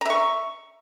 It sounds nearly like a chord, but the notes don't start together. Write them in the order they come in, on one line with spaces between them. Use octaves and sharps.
A#5 E5 C#6